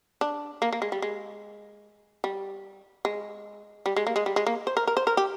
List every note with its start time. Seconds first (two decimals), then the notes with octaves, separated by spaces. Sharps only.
0.21 D4
0.62 A#3
0.73 A#3
0.82 G#3
0.92 G3
1.02 G#3
2.24 G3
3.05 G#3
3.86 G3
3.96 G#3
4.07 A#3
4.16 G#3
4.26 G3
4.36 G#3
4.47 A#3
4.67 C5
4.77 A#4
4.87 A#4
4.97 C5
5.07 A#4
5.17 G4